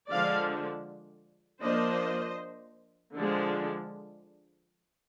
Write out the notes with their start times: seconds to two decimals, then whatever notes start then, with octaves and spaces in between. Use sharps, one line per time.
0.11 D3 F3 G#3 D4 D5 F5
1.62 F3 A#3 D4 C5 D#5
3.14 D3 F3 G#3 D4